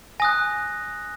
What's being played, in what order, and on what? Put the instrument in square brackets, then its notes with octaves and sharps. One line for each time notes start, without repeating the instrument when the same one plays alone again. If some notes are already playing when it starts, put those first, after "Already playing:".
[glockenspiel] G#5 D#6 F#6 A#6